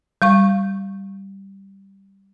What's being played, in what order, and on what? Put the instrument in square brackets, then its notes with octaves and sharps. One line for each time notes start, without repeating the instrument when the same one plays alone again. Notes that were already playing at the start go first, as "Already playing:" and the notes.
[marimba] G3 F5 C#6